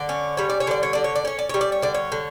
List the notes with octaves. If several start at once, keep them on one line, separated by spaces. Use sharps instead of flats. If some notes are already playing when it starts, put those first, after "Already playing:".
Already playing: D3 D5
C#4
G3 C#5
D5
C#5
D3 D5
C#5
D3 D5
C#5
D5
C#4 C#5
D5
G3 C#5
D5
C#5
D3 D5
C#5
D3